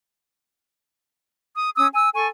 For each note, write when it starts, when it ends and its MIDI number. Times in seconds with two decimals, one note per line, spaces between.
1.56 1.69 87
1.76 1.87 61
1.76 1.87 87
1.76 1.87 88
1.94 2.09 80
1.94 2.09 88
2.13 2.27 69
2.13 2.27 80
2.13 2.27 85